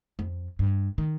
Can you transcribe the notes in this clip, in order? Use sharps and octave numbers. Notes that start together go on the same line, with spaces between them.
F2
G2
D#3